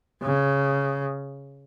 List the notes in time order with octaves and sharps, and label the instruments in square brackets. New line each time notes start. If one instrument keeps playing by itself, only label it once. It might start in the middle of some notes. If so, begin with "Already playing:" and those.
[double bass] C#3